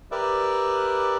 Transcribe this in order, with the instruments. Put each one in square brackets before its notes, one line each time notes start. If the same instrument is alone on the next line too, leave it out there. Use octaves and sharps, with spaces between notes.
[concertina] G4 A#4 B4 D5 E5